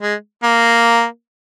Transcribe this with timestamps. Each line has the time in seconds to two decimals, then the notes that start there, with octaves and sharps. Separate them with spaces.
0.02 G#3
0.43 A#3